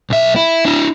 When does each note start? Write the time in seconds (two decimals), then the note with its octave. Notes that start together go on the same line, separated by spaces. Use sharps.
0.10 B1 E5
0.36 E4
0.65 D4 E4